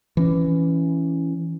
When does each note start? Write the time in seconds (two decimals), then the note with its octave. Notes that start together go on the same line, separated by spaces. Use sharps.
0.17 E3 C#4